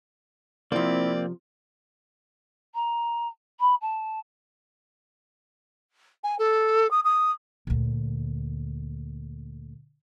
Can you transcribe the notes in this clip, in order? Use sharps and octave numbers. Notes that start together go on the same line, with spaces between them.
C3 F3 A#3 C4 E4 D5
A#5
B5
A5
G#5
A4
D#6
D#6
D2 A#2